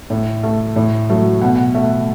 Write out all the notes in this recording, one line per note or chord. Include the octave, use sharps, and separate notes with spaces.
A2
A3
A2
F#3 A3
B2 F#5
F#5
A3 E5